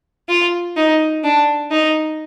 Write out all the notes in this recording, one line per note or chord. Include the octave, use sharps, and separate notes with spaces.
F4
D#4
D4
D#4